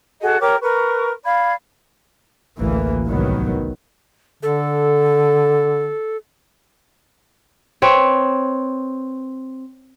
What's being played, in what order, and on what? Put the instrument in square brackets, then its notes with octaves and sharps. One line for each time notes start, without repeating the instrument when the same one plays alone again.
[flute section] F#4 G#4 A4 D#5
G4 A#4 C#5 D6
A#4 B4 C#6
D5 F5 B5 G#6
[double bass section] A1 D2 E3 A#3
C2 A2 D#3 F#3 B3
[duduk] D3 [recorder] A4
[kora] C4 B4 C#5